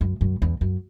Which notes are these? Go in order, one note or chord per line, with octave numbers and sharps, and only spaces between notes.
F#2
F#2
E2
F#2